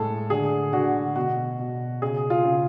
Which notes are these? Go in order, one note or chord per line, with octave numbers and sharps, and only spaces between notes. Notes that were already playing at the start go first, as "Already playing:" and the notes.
Already playing: A2 G#3 G#4 A4
D3 G#4
D3 F#4
B2 F#4
B2
C#3 G#4
F4
C#3